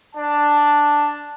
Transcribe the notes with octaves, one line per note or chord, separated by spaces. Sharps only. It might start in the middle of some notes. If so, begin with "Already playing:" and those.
D4 A5